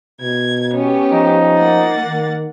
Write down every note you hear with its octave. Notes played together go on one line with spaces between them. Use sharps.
B2 G#6
B3 C#4 G4
F3 D#4
A#3 F#5 A6
D#3